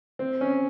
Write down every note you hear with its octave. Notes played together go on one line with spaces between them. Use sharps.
C4
C#4